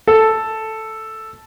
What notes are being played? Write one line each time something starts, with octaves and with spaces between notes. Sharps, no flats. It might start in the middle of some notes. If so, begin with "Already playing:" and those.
A4